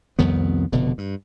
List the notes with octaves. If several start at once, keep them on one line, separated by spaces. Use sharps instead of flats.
C2 F2 D#3 B3
F1 B2 D3
G2